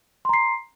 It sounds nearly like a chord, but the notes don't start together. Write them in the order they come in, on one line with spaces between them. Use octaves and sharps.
C6 A#5 C7